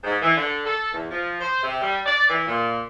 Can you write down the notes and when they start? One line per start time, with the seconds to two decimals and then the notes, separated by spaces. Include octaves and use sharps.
0.04 G#2
0.22 E3
0.36 D3
0.65 A4
0.92 E2
1.11 F3
1.41 C5
1.63 C3
1.81 G3
2.06 D5
2.29 E3
2.47 A#2